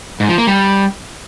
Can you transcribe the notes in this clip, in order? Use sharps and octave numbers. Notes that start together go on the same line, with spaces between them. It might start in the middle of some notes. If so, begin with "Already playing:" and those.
G#2
F3
A#3
G3